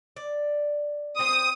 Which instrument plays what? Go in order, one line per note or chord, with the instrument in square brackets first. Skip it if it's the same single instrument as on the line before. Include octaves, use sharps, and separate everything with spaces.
[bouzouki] D5
[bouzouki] C4 C5 [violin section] D#6